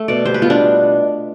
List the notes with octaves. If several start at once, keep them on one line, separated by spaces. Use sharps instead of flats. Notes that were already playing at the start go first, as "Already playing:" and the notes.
Already playing: A3
B2 D5
G3 C5
B4
B3 F4
D4